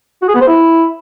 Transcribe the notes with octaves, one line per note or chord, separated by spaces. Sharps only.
F#4
G#4
B3
C5
E4